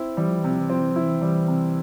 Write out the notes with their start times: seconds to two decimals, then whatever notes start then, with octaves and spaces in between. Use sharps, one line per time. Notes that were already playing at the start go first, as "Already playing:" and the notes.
Already playing: C4 E4
0.17 E3 G3
0.28 F3
0.39 E3
0.44 C3
0.49 F3
0.60 E3
0.70 F3 C4
0.81 E3
0.92 F3 E4
1.03 E3
1.22 E3 G3
1.48 C3